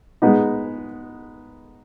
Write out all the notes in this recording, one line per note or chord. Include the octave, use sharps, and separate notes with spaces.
G#3 B3 D#4